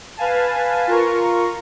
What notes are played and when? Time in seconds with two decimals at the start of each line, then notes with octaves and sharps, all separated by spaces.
0.17 B4 F5 G#5 A5
0.87 F4 A#4 C#6